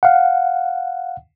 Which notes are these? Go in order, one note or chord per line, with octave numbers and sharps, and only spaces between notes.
F5 F#5